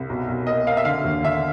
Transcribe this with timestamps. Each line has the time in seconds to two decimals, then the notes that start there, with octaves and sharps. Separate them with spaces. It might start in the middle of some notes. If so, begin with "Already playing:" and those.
Already playing: C2
0.09 B1
0.28 B1
0.47 A#3 D#5
0.67 A#3 F5
0.77 E5
0.85 D3 F5
1.04 D#2
1.23 D3 E5